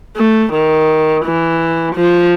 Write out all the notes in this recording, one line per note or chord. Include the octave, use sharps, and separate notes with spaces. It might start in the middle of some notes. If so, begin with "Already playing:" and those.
A3
D#3
E3
F3